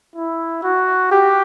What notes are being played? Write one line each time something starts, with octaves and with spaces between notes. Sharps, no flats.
E4
F#4
G4